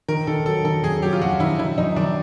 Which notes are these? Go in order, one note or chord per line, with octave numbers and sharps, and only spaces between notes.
D#3 A#4
D#3 A4
F#3 A4
D#3 A4
F#2 G#4
F#3 G4
F4
F#2 F#4
D#3 E4
D#3 E4
F#2 D#4
D#3 D4